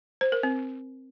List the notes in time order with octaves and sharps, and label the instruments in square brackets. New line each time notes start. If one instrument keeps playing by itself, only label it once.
[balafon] C5
A#4
C4